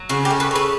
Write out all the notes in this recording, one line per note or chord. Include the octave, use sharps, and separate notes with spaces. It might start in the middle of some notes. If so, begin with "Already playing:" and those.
Already playing: F#3
C#3 F#4
G4
A3
B4
C#3 B4